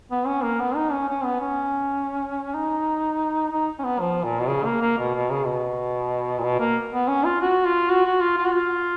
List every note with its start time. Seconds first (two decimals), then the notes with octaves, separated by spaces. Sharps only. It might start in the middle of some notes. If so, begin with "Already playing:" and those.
0.12 B3
0.27 C#4
0.43 A#3
0.60 B3
0.76 D#4
0.92 C#4
1.09 C#4
1.24 B3
1.41 C#4
2.54 D#4
3.51 D#4
3.79 C#4
3.84 B3
4.00 F3
4.24 A#2
4.40 B2
4.49 C#3
4.65 A#3
4.81 A#3
4.98 B2
5.14 B2
5.31 C#3
5.46 B2
6.38 A#2
6.44 B2
6.60 A#3
6.93 B3
7.08 C#4
7.25 F4
7.41 F#4
7.65 F4
7.90 F#4
8.06 F#4
8.22 F4
8.38 F4
8.46 F#4
8.52 F4